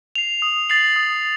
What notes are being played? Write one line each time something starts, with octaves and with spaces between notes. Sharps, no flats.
C7 F7
D#6
A6 C7 F#7
D#6